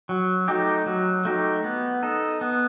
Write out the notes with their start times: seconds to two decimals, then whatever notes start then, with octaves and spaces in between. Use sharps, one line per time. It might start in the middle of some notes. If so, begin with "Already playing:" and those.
0.09 F#3
0.48 A3 D#4 G4
0.86 F#3
1.25 A3 D#4 G4
1.64 B3
2.03 D#4 A4
2.41 B3